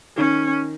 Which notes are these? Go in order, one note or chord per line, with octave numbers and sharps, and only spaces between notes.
D#3 C#4